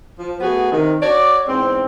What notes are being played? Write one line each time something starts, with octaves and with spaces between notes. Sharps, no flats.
F3
A3 B3 F#4 G#4
C3 D#3
F#4 C#5 D5
E2 G#2 C4